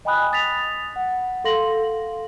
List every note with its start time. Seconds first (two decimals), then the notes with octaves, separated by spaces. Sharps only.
0.05 D#5 G5 G#5 B5 D#6 F#6
0.32 D#6 A6 B6 F7
0.96 F#5
1.44 A4 F5 C6 A#6 F#7